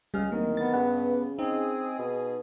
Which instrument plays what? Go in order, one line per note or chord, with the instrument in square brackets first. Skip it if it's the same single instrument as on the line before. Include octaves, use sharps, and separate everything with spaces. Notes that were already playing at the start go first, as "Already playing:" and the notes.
[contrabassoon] C#2 [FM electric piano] G3 F6 [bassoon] G#4
[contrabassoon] D1 [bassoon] D#3 [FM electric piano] A#3
[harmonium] B3 [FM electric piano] A6
[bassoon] G2 [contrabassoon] C#3 [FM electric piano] F#5
[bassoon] C4 [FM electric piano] D#4 [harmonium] G#4
[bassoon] B2